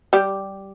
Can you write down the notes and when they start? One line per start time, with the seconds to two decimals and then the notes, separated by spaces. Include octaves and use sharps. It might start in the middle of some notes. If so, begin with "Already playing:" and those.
0.13 G3 G4